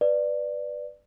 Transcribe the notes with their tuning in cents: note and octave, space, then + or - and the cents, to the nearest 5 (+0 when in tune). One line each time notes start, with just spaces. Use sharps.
B4 +0 D5 +10